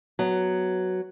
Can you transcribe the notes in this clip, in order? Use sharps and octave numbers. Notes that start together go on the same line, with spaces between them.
F#3 B3